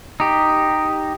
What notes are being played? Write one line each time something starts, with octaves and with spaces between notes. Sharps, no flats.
D#4 G4